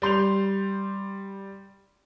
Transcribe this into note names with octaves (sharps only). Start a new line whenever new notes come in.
G3 C6 G6 F7